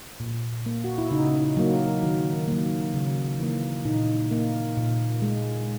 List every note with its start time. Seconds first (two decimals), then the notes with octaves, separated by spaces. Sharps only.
0.20 A#2
0.66 A#3
0.84 F#4
0.98 E4
1.11 C#3 D#4
1.57 F#3 A#3
2.03 D#3
2.48 F#3 A#3
2.94 C#3
3.39 E3 A#3
3.85 A#2 D#4
4.31 A#3
4.77 A#2
5.22 G#3